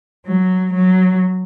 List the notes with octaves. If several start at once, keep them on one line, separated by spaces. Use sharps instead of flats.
F#3
F#3